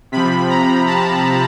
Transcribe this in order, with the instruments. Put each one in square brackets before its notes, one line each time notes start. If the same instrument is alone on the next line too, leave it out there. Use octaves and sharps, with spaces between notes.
[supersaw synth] C3 F3 B5
A#5
A5